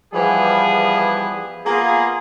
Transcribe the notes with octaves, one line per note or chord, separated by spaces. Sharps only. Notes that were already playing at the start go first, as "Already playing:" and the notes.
E3 F3 G3 B3 G#4
A#3 B3 F4 G#4